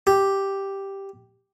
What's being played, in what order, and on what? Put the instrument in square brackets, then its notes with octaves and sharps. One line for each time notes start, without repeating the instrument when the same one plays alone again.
[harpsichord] G4